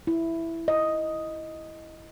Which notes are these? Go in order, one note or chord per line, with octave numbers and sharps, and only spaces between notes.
E4
D#5